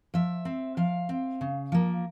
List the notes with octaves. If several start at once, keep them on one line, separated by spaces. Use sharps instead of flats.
F3 E5
C4
F3 F5
C4
C#3
F3 A#3